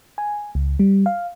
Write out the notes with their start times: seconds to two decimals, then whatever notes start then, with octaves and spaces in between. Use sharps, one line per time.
0.18 G#5
0.55 C#2
0.79 G3
1.06 F5